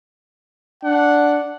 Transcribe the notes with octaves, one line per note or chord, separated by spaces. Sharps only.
D4 F#5